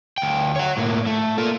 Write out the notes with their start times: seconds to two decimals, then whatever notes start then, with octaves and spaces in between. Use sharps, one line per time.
0.18 D2 G5
0.56 C#5 F#5
0.77 A2 A#3
1.06 A3
1.38 A#3 F4